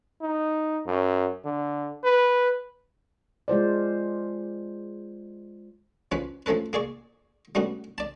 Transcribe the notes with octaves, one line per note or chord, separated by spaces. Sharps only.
D#4
F#2
D3
B4
G#3 F4 C5 D5
F3 C#4 B4
F3 A3 C#4 A4 B4
A#3 G#4 D5 C#6
G3 A3 B3 C#4 F#4
D5 A5